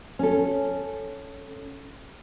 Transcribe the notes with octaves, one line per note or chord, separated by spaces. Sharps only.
C#4 A4